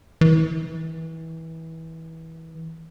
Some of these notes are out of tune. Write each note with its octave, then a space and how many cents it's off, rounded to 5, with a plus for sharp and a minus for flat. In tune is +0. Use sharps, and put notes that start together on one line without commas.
E3 -25